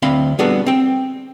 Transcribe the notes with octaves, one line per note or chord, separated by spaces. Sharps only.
D2 C4 F5 B5 C6
G3 B3 D4 F#4 G#4 A4
C4 G5